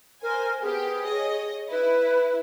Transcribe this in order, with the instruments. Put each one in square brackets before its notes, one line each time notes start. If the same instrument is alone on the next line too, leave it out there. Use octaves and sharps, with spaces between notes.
[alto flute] A#4 [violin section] C5 G#5
[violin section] B3 G4 [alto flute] G#4
[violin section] C#5 D#5
[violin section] E4 [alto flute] B4